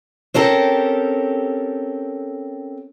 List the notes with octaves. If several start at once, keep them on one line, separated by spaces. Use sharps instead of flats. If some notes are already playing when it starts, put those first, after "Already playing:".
C4 C#4 G4 A4 A#4